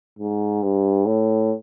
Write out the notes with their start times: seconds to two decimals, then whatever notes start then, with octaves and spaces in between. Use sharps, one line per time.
0.19 G#2
0.63 G2
1.07 A2